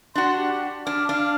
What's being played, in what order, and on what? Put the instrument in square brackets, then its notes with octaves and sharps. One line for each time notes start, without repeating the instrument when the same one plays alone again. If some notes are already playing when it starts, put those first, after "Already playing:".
[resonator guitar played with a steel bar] D4 F#4 [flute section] D5 C6
[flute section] G4
[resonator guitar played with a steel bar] D4 [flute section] D6 F6
[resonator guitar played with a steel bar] D4 [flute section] F5 F6